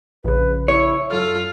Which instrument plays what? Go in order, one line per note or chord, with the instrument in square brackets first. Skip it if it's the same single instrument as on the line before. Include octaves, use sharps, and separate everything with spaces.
[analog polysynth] A#1 C#3 [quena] B4
[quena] E4 [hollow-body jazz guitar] C#5
[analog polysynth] F#2 F#3 F6 [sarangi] F4 [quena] A4